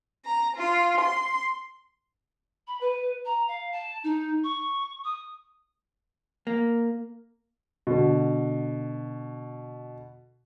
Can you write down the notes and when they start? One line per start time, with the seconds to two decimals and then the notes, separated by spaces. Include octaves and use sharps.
0.23 A#5
0.57 F4
1.01 C6
2.67 B5
2.80 B4
3.25 A#5
3.48 F5
3.72 A5
4.03 D#4
4.44 C#6
5.04 D#6
6.47 A#3
7.87 B2 D3